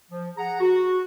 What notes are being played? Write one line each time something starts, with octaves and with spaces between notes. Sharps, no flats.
F3
G#4 F#5 A#5
F#4